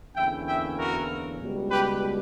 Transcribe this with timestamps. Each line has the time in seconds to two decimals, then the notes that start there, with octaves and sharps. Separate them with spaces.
0.15 E2 D3 A#3 C#4 E4 E5 G5
0.46 E5 G5
0.77 F#4 A#4
1.40 C#2 B2 G3
1.69 G4 B4